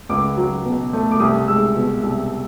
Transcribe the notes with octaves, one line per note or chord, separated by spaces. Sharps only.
C#2 D6
F#3
B2
A3
D6
C2 D#6
G#3 E6
B2
C2